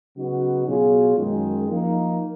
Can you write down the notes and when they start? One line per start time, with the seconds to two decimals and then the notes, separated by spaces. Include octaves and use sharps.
0.16 C#3 F#3 B3 D#4 F#4
0.66 B2 F#3 C#4 F4 G#4
1.17 F#2 D#3 G#3
1.68 F3 A#3 D#4